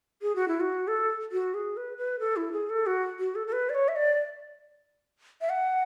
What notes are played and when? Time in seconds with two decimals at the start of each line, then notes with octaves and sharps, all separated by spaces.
0.22 G#4
0.35 F#4
0.48 E4
0.60 F#4
0.88 A4
1.32 F#4
1.54 G#4
1.77 B4
1.97 B4
2.19 A4
2.36 E4
2.52 G#4
2.69 A4
2.86 F#4
3.19 F#4
3.35 A4
3.47 A4
3.52 B4
3.69 D5
3.74 C#5
3.88 E5
3.96 D5
5.41 E5
5.49 F#5